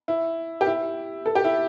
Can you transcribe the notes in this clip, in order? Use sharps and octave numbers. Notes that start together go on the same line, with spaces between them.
E4
G4
E4
A4
G4
E4